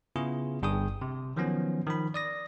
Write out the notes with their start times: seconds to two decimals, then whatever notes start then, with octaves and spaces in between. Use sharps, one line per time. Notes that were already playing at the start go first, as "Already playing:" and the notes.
0.16 C#3 B3 E4 F4 G#4
0.62 G1 G2 G#4 G5 D#6
1.01 C3
1.36 D#3 F3 F#3 B3 C#4
1.86 D#3 F3 B5
2.14 D5 D#6 A#6